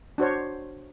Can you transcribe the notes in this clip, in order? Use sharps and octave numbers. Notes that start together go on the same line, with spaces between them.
D4 F#4 C5 C#5